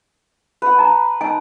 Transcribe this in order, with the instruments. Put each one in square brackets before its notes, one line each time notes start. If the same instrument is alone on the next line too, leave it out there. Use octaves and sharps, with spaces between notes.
[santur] B4 F#5
[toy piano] A5 A#5
[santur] D#4 [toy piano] G#5 A5